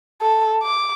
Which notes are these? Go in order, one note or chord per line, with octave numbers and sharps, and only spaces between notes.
A4
D6